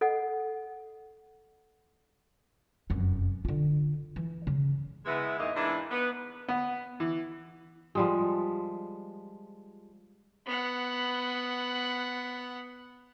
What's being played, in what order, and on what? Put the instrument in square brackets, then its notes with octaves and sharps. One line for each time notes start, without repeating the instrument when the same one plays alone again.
[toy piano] A4 D#5 F#5
[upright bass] F1 F#2
D3 F4
E3
C#3
[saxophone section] G#3 B3 E4
E2 G#2 E3 A#3 D#5 E5
G#2 E3 A#3 D4 E4
B3 B4
[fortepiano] B3
E3
[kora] F3 G3 G#3
[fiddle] B3 F#5